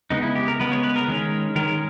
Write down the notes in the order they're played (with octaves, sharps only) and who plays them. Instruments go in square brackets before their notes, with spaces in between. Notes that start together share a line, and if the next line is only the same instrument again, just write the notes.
[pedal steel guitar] C#3 G#3 B3 D#4
E4
G4
A#4
C#3 G#3 B3 B4
C#5
B4
A#4
D#3 G#3 C#4
D#3 G#3 C#4 A#4